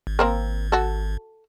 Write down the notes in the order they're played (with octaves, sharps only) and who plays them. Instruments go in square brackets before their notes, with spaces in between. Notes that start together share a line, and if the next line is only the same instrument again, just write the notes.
[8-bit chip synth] G#1
[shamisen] A#3 C4 A#4
F#4 A4